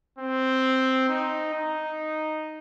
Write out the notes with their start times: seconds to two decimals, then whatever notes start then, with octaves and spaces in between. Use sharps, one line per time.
0.19 C4
1.09 D#4
1.54 D#4